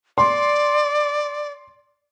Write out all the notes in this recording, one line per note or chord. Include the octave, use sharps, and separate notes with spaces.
D5 C6